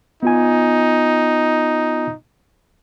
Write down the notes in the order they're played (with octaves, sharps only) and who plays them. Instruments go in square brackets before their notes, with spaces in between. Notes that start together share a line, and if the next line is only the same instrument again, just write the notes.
[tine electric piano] B3 F4 G#5 [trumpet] D#4